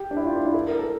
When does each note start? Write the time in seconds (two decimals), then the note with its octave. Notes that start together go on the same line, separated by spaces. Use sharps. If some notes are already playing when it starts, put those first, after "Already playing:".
Already playing: G4
0.11 D4
0.17 E4
0.26 F4
0.36 D4
0.45 E4
0.54 A4
0.67 A#4
0.79 A4